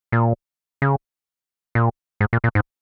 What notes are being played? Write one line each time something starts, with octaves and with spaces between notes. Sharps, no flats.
A#2
C#3
A#2
G#2
A#2
A#2
G#2